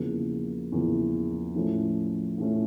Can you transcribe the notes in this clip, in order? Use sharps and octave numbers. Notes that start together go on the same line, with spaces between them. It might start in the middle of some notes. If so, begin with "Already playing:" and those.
Already playing: E2 C#3 F3 A#3
E2 C#3 F3 A#3
A2 F3 A3 C#4
A2 F3 A3 C#4